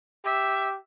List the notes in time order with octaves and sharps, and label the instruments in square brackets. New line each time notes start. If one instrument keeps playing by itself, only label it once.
[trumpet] G4 [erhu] E5